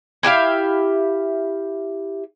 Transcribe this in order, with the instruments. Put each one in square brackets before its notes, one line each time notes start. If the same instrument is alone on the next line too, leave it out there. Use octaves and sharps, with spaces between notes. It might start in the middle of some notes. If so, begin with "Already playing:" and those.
[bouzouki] E4 G4 E5 F5